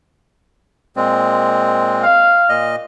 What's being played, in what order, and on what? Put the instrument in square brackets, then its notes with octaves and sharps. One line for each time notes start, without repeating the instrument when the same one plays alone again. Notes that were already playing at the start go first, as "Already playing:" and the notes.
[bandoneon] A#2 G#3 C4
[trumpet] F5
[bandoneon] A#2 D#5